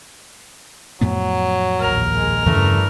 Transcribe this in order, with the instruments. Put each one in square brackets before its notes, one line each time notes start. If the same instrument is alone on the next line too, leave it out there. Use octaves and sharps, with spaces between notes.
[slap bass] F2 A2 B3 [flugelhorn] F#3
[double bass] A#1 D#2 [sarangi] A#4
[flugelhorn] G#3
[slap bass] E2 C#3 [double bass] G2 E3 [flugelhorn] A3